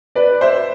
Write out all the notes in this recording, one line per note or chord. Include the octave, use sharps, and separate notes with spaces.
B4 D5
C5 E5